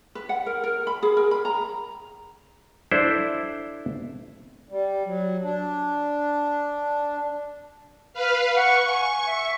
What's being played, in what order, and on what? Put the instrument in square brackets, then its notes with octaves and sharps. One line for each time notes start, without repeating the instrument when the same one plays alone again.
[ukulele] B4
F#5
A#4
A#4
B5
G#4
A#4
B5
A#5
[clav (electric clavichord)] D4 E4 A4 C5 D5
[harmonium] G3
F#3
D4
[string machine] B4 F5
[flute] F#5 [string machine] C#6
[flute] G#5
E5